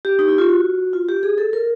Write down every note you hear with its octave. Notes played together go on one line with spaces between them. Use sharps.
G4
D#4
E4
F4
F#4
F4
G4
G#4
A4
A#4